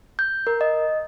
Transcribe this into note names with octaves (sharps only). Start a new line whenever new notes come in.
G6
A#4
D#5